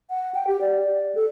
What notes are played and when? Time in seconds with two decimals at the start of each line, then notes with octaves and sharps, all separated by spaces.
0.10 F#5
0.35 G5
0.47 G4
0.61 D5
0.80 D5
1.15 A4